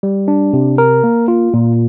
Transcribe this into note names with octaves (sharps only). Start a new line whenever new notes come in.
G3
D4
C3
A#4
A#3
F4
A#2